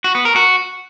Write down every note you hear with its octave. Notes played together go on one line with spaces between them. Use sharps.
F#4
B3
A#4
F#4